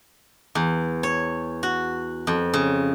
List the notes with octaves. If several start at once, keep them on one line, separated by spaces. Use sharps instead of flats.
E2
C#5
F#4
F2
C#3